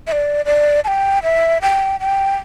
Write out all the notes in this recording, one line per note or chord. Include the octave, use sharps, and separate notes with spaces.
E5
D5
D5
A5
G5
E5
G5
G5